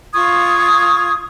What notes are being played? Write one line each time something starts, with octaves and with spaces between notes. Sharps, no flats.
F4 C#6 D#6 G#6